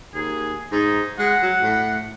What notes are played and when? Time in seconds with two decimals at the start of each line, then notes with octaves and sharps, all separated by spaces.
0.14 D#2 G#4
0.72 G#2 D#4
1.19 G#3 F#5
1.43 F#3
1.62 A2